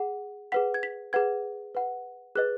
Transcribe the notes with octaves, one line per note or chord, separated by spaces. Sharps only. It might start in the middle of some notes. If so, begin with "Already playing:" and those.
Already playing: G#4 F#5
G#4 B4 F#5 B6
G#6
B6
G#4 B4 F#5 G#6
B4 F#5
G#4 B4 D#5 F#6